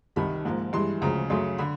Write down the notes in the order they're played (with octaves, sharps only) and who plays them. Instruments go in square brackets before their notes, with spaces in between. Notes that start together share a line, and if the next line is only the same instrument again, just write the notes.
[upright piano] C2 C3 D#3 B5
G#2 F3 A#3
G2 E3 G#3 C6
D2 C#3 F3 G#3 A#5
F#2 C#3 F#3 A3 C6
D3 B5